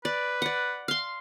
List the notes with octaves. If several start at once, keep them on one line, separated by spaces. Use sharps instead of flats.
B4 D5
D5 F#5
F5 C6